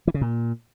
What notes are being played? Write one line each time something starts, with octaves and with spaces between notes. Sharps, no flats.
E3
C#3
A#2